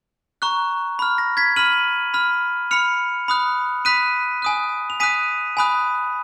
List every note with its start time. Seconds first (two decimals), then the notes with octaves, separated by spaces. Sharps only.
0.42 A#5 C#6 F#6
0.99 B5 F6
1.18 A#6
1.37 G#6 B6
1.56 B5 F6 D#7 F#7
2.14 B5 F6
2.71 B5 F6 C#7 F7
3.28 B5 D#6 F#6
3.85 B5 D#6 F#6 B6 D#7
4.42 G#5 D#6 F#6
4.90 F7
5.00 G#5 D#6 F#6 B6 D#7
5.57 G#5 B5 D#6 F#6